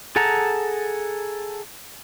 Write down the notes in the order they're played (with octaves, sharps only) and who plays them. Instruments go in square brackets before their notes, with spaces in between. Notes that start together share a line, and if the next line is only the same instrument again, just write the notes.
[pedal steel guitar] G#4 A4 F#5 A5 A#5